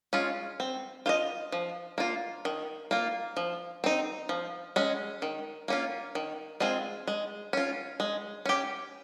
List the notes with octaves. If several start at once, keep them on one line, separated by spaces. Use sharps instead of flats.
G#3 C#4 F4
C4
F4 C5 D#5
F3
A#3 F4
D#3
A#3 F4
F3
C4 D#4
F3
G#3 C#4
D#3
A#3 C#4 F4
D#3
G#3 C4 F4 G#4
G#3
C#4 F4
G#3
C#4 G4